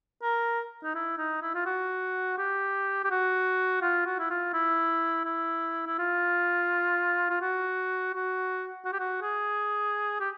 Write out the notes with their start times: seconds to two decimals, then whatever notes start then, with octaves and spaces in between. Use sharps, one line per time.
0.22 A#4
0.83 D#4
0.95 E4
1.18 D#4
1.42 E4
1.54 F4
1.66 F#4
2.38 G4
3.04 G4
3.10 F#4
3.82 F4
4.06 F#4
4.19 E4
4.30 F4
4.53 E4
5.25 E4
5.87 E4
5.98 F4
7.30 F4
7.41 F#4
8.14 F#4
8.85 F#4
8.93 G4
8.99 F#4
9.21 G#4
10.20 G4